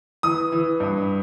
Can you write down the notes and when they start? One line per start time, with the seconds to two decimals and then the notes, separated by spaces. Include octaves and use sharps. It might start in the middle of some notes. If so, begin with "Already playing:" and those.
0.23 E3 D#6
0.52 E3
0.80 G2